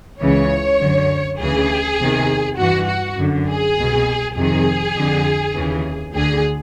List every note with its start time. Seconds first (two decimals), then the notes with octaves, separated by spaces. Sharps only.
0.21 C#2 C#3 E3 C#5
0.80 F#2 D3
1.40 D2 C#3 E3 G#4
1.99 E2 C3 D#3
2.57 G2 E3 F#4
2.87 F#4
3.17 F#2 D3
3.47 G#4
3.77 C2 B2
4.35 F2 C3 D#3 G#4
4.95 F2 D3
5.54 D#2 C#3 E3
6.13 D2 D3 G#4